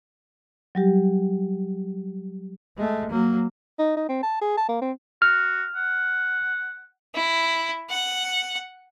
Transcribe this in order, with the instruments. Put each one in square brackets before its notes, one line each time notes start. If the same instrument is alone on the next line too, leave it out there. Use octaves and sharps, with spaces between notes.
[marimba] F#3 G3 G4
[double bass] G#3 A3
F#3 A#3
[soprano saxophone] D#4
D#4
C4
A5
G#4
A5
A#3
C4
[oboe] F#4 [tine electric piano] F6
[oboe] F#5
[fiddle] E4
F#5